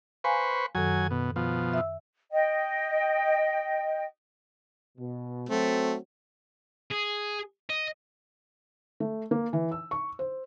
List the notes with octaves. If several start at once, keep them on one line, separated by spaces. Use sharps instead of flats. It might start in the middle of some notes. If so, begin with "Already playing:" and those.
B4 C5 F5 G#5 A#5 C#6
F#2 D#3 F#3 A4 G#5
B2
B2 F3
E5 E6
D#5 G5
B2
F#3 A3 C4
G#4
D#5
A3
A#3
E3
E6
C#6
C5